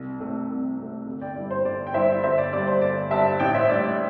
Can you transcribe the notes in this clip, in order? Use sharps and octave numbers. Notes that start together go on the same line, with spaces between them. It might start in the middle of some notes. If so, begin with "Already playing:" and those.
Already playing: C2
C3 A3
C2
C3 A3
G1
D5 G5
G2 G3 E4 D5
C5
G1 D5
G5
G2 G3 E4 C5 E5
G1 C5 E5
D5
G2 G3 D5
C5
G1 D5
G2 G3 E5 A5
A1 D5 G5
C5 E5
A2 G3 D4 D5
D5